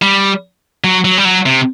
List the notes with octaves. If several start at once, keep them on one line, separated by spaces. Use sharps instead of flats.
G3
F#3
F#3
G3
F#3
C3